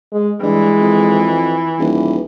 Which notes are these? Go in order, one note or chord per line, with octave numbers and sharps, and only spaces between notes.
G#3
G2 E3 G#3
F2
D#1 E3